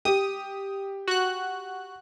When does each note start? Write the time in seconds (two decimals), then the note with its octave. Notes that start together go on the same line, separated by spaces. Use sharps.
0.05 G4 D#6
1.08 F#4 F#6